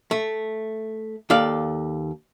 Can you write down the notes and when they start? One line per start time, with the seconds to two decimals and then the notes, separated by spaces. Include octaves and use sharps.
0.11 A3
1.30 D#2 A4 D5 F5